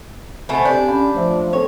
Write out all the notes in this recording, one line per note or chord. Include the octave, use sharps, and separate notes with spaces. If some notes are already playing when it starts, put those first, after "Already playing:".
B2 A3 C4 G#5 A5
D4 G4 G6
C#4 D5 F5 B5
F3 A3 C5 E5
B3 C4 A4 C#5